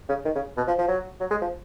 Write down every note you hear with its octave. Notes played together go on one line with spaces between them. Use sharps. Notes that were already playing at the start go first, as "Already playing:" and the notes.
C#3
D#3
C#3
B2
F3
F3
F#3
F#3
G#3
F3